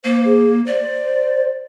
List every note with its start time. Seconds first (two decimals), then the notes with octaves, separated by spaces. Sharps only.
0.04 A#3 C5
0.25 G#4
0.67 C5 D5